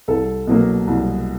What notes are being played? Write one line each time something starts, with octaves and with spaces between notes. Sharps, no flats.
C2 A4
B2 F#3 A#3
C2